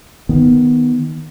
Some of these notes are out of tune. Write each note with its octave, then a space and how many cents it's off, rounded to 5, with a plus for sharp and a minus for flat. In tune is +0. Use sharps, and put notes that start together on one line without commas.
D#3 +0 B3 +0